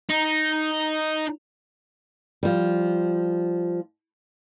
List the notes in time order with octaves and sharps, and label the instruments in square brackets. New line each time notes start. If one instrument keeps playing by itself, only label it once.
[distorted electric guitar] D#4
[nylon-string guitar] F3 G3